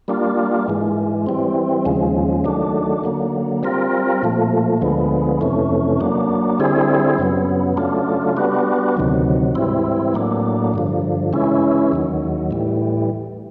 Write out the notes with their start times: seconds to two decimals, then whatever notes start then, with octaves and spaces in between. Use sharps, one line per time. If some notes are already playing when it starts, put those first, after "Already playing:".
0.08 G3 A#3 D4 F4
0.68 G#2 E3 G#3
1.27 E3 G3 C4
1.85 D#2 C#3 F3 G#3
2.44 D#3 F#3 A3 D4
3.04 D3 F#3 A#3
3.63 G3 C4 F4 A#4
4.23 A#2 F3 A3
4.81 D2 D3 F3 G#3 B3
5.41 F2 C3 E3 A3 C#4
6.01 F#3 A#3 D4
6.59 D3 G3 C4 E4 G#4
7.19 F#2 C#3 F#3 B3
7.77 C#3 F#3 A3 D4 F4
8.37 G3 B3 D4 F#4
8.97 D2 C3 D#3 F#3
9.55 G#2 E3 G3 C4 E4
10.14 A2 F#3 A#3 D4
10.74 G2 D3 F3
11.33 C#3 E3 G#3 C#4 E4
11.92 D#2 D#3 F#3
12.51 A2 E3 G3